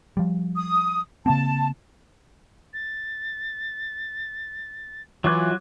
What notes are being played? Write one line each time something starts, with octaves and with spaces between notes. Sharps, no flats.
F3 G3
D#6
C#3 A#3 C4 A5
A6
E3 F#3 F4 C#6 D6 F#6 G#6